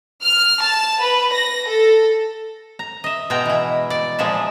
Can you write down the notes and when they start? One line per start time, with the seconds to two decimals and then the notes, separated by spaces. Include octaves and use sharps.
0.23 F6
0.61 A5
1.00 B4
1.33 A#6
1.67 A4
2.79 A#5
3.04 D#5 E5
3.30 B2 G#3 G5 A#5
3.45 E3 E4
3.90 D5
4.19 A#2 F3 G#3 E5